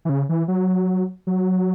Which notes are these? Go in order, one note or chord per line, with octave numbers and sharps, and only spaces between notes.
E3
C#3
E3
F#3
F#3